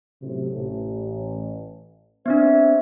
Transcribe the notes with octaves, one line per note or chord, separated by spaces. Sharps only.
F#2 A2 C3
A1
B3 C4 D4 C5 E5